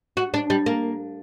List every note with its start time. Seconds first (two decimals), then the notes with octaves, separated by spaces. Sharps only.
0.17 F#4
0.34 D4
0.50 G3
0.66 A#3